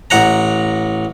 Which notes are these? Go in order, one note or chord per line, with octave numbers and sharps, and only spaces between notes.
A1 F#5 A#5